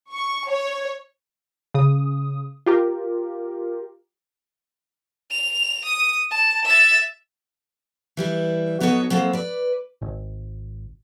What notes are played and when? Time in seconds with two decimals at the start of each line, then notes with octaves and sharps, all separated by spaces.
0.10 C#6
0.47 C#5
1.74 C#3 D#6
2.66 F4 G4 A#4
5.31 F7
5.85 D#6
6.31 A5
6.65 E5 A6
8.17 E3 G3 E4
8.80 F#3 B3 D#4 A4 C#5 D#5
9.10 F#3 A#3 C4 A4
9.33 B4 D5
10.02 G#1